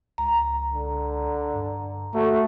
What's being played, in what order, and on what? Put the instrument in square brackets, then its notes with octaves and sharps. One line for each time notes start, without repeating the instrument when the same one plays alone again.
[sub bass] C#2 [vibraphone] A#5
[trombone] D3
[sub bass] G2
[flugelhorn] A3 [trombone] F#4